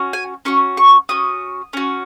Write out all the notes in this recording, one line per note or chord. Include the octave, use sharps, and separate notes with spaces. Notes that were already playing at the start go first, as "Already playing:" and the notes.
Already playing: C#4 F#4
G#5
C#4 F#4 C#6
C#6
C#4 F#4 D#6
C#4 F#4